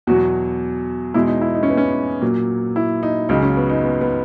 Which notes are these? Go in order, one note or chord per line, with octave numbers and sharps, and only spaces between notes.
E2 B2 F#3 F#4
E2 B2 G#3 E4
D#4
E4
D#4
C#4
B3
C#4
A#2 F#3
E4
D#4
C#2 C#3 F#3 D#4
C#4
B3
D#4
B3
B3